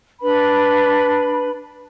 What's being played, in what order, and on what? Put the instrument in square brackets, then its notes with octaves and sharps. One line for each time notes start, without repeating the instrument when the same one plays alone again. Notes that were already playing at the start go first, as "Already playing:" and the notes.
[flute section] D4 B4 B5